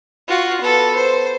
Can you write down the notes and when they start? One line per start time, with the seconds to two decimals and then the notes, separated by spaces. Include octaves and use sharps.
0.28 F4 F#4
0.61 B3 A4
0.95 C5